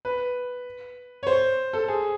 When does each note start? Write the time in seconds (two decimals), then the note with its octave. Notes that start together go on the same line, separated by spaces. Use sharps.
0.05 B4
1.23 C#5
1.27 C5
1.73 A4
1.88 G#4